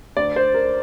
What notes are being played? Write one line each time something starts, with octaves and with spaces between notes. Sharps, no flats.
D2 D3 D5
C5
A#4